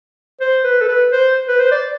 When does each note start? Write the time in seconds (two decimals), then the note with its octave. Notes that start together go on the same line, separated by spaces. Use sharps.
0.41 C5
0.64 B4
0.81 A4
0.89 B4
1.12 C5
1.48 B4
1.60 C5
1.72 D5